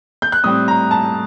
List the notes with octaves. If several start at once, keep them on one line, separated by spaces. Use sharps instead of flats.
G6
F#6
A2 G3 C4 D#6
A#5
A5